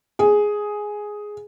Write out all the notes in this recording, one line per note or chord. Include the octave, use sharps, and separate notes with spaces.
G#4